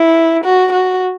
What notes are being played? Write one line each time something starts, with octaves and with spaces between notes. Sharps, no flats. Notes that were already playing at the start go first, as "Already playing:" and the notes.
Already playing: E4
F#4
F#4